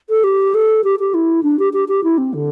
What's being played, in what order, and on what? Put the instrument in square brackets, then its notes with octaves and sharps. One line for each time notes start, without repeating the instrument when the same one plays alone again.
[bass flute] A4
G4
A4
G4
G4
E4
D4
G4
G4
G4
E4
C4
D3